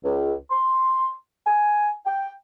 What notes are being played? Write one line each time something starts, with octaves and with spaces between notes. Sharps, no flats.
C#2
C6
G#5
G5